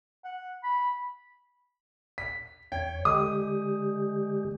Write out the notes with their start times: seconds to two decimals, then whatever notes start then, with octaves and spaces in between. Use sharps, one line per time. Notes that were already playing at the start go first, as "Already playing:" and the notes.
0.25 F#5
0.63 B5
2.18 B6
2.72 E2 C#5 G5
3.05 D3 G#3 G4 D#6